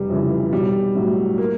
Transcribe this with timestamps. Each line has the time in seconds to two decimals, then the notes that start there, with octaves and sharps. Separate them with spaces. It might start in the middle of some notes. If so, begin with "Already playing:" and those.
Already playing: F1 G3
0.10 F2 C#3 E3
0.53 B1 G3
0.95 A2 F#3
1.38 A#3